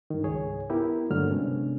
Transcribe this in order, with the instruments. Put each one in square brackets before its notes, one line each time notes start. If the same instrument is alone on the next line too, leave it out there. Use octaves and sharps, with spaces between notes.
[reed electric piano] G2 D#3
C#2 G#2 G#4 C#5
B3 E4 G4 A#4
G2 D3 F#3 A3 A#3 F6
C3 G#3 B3 C#4 D4